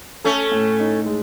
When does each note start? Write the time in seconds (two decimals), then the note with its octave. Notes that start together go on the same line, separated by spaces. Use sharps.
0.24 A3 C#4 A4
0.52 A2
0.80 D#4
1.06 G#3